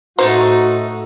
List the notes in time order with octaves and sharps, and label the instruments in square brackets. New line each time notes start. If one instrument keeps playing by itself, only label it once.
[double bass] A2 [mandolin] A3 A#3 D#4 [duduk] F#4 [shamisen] C5